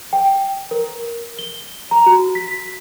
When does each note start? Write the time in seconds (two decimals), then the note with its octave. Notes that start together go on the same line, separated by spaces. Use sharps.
0.13 G5
0.71 A#4
1.39 G7
1.91 A#5
2.06 F#4
2.35 B6